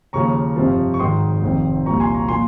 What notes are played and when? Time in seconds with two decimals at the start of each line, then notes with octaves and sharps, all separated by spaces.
0.13 D#2 C#3 F3 A#5 C#6
0.56 G1 F2 C3 F3
0.94 C#6
0.99 G#1 G#2 D#3 C6 D#6
1.42 F1 F2 D#3
1.86 C2 A#2 F3 A#5 C#6
2.00 G#5 C6
2.14 A#5 C#6
2.29 A#2 F3 G#5 C6